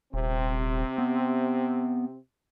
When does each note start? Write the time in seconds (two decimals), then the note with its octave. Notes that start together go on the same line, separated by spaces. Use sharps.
0.14 D#1 C3 C4
0.98 B3